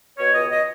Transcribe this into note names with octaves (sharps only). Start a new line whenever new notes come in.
B2 C#5
C#2 D#5
D#5